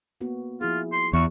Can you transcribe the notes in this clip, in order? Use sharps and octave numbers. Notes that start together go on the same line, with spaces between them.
A#3 B3 F#4
F3 E4 F4 G#4
C6
E2 C#6